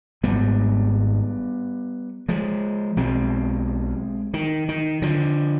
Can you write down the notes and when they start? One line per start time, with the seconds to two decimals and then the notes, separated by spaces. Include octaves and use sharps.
0.24 G#1 G#2 G3 B3
2.29 F3 G#3
2.97 B1 B2 G#3 C4
4.34 D#3
4.69 D#3
5.02 D3 F3